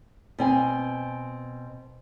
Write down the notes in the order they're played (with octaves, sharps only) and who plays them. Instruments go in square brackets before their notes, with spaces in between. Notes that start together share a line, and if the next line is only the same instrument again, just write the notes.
[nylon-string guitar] B2 C4 G#5